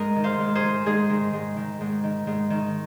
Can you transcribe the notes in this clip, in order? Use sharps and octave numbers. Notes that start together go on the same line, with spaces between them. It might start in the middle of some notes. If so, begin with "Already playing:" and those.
Already playing: G#2 A#4 D#5
D#3
C5 F5
G#2
G#4 C5
D#3
G#2 D#4 G#4
D#3
G#2
D#3
G#2
D#3
G#2
D#3